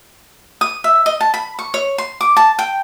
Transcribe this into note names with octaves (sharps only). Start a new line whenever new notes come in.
D#6
E5
D#5
A5
B5
C#6
C#5
C6
D6
A5
G5